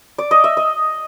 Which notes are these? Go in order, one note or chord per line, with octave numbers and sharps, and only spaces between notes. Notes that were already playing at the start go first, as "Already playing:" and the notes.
D5
D#5
E5
D#5